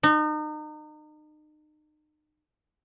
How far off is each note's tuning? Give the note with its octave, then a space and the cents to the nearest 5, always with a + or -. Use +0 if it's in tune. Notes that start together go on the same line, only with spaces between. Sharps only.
D#4 -35